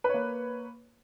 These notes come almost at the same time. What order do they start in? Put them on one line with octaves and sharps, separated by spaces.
B4 C#5 A#3